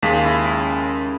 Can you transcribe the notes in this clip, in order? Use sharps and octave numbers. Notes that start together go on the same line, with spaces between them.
D#2 C#3 G#3 B6
C#4 E4 D#5